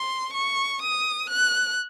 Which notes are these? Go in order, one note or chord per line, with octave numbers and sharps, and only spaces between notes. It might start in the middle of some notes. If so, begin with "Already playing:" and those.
Already playing: C6
C#6
D#6
F#6